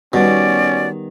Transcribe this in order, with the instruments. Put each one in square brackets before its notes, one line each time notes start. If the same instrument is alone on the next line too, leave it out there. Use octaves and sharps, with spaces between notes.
[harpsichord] B2 [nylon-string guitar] D#3 G3 B3 [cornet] C#4 [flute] D5